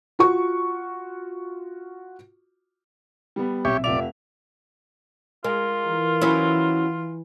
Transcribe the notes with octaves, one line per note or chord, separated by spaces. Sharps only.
F4 F#4 C#6
G3 B3
B1 A#2 C4 G4 C#5 E5
F1 D5 E5 F7
G#3 F4 A#4
E3
F#3 C#4 E4